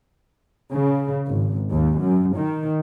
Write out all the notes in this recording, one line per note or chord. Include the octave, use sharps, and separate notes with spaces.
C#3
G#1
D#2
F#2
D#3